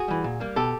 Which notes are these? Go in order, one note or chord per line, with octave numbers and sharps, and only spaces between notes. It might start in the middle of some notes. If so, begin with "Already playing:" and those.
Already playing: F#4 G#4
E3 G3
A#2
G3 A#3
B2 G4 A4